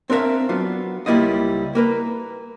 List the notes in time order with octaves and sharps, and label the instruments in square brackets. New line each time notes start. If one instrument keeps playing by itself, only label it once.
[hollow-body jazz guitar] C4 D4 A#4 E5 F5
F#3 B3 D4 F4
C#2 G3 A#3 E4 F4 D#5
A#3 A#4 B4